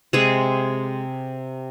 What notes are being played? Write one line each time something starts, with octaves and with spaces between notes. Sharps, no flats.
C3 G#3 G#4